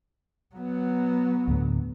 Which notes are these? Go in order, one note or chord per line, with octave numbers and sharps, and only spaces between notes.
F#3 B3
D2 A2